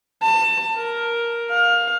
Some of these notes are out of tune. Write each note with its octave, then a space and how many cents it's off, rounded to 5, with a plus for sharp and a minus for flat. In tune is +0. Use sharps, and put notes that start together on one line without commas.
A5 +25
A#4 +10
F5 +20